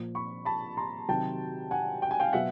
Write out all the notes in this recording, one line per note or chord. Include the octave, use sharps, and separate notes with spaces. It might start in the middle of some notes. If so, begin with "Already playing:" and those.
Already playing: A#2 F3
B5 C#6
A5 B5
A#5 C6
C3 D#3 F#3 G5 A5
F#5 G#5
G5
G#5
F5 G5
B2 F#3 E5 F#5